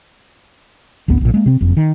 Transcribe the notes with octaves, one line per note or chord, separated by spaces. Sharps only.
D1 G#1 D2 B3
A#1 A#2
G#3 A#3
C3 C4
F#1 F2
D#3